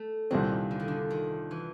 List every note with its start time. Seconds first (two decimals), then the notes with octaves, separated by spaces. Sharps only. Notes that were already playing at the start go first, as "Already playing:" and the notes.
Already playing: A3
0.31 C2 A#2 D#3 G3 C4
0.71 D3
0.80 D#3
0.88 D3
1.11 D#3
1.51 E3